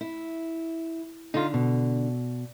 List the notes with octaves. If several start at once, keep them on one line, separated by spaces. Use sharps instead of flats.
E4
D3 D#4 F4
B2